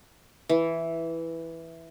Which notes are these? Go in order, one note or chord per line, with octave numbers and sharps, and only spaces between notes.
E3